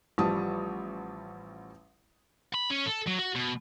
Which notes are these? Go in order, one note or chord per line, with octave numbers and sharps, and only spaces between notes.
A1 F3 G3 A5 D#6
B5
C#4
A4
F#3
F#4
B2